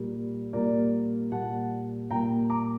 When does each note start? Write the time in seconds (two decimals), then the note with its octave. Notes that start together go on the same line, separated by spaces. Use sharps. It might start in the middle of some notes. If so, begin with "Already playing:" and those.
Already playing: A#2 G3 A#3
0.53 A#2 G3 A#3 A#4 D5
1.32 A#2 G3 A#3 F#5 A5
2.10 A#2 G3 A#3 G5 A#5
2.50 A#5 D6